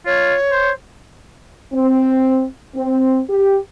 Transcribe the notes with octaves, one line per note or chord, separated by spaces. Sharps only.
F4 C#5
C5
C4
C4
G4